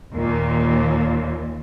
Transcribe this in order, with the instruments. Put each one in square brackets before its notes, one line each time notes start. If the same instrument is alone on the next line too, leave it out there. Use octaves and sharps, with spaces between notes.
[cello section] D#2 A#2